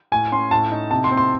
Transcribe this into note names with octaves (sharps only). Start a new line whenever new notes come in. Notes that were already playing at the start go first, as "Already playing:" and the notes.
A2 G#5
C#4 C6
A2 A5
D#4
C3 A5
C6
C4
C6